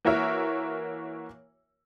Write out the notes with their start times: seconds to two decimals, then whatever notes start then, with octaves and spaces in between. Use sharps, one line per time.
0.05 E3 A#3 F#4 A#4 C#5 E5